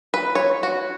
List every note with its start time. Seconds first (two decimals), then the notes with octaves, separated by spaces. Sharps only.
0.14 B4
0.35 C#5
0.63 F#4